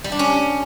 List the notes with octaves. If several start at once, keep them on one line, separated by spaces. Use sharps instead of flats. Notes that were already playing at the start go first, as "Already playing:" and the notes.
G3
D4
C#4